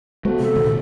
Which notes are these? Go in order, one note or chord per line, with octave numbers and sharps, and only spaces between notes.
G#3 B3 F#4 A4 C5
C3 F#4 A4
D1 A#2 D#3